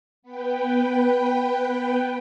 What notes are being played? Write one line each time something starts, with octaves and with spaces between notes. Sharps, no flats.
B3 B4 G5